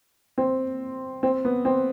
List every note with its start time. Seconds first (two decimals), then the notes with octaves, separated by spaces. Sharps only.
0.38 C4
1.23 C4
1.45 B3
1.65 C4